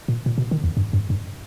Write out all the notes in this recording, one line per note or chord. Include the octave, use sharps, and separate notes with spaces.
A#2
A#2
B2
D#3
E2
G2
G2
G2